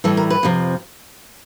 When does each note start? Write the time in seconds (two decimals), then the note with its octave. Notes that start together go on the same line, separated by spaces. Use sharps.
0.04 A2 E3 G3 A4
0.17 A#4
0.30 B4
0.43 F2 C3 F3